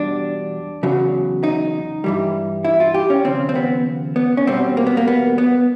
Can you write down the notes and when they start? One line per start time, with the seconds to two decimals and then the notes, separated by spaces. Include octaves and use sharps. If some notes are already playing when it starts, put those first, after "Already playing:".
Already playing: E2 B2 G3 D4
0.83 E2 C#3 F#3
1.43 D#4
2.04 G2 E3 G3
2.65 E4
2.80 F4
2.94 G4
3.10 C#4
3.25 D#2 C#3 F3 C4
3.49 C4
3.55 B3
4.16 B3
4.37 C#4
4.46 E2 B2 G3 C4
4.77 A#3
4.87 B3
4.97 A#3
5.08 B3
5.38 B3